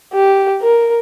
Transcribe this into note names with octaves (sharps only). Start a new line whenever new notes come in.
G4
A#4